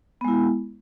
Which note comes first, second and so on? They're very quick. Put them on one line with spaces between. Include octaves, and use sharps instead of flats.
B3 G#3 E4